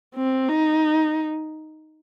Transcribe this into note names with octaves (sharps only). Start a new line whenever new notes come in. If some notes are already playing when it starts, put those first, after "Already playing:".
C4
D#4